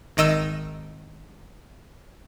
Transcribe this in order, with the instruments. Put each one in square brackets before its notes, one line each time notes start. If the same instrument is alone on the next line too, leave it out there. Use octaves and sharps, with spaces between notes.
[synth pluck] G#1 D#3 D#5 E6 D#7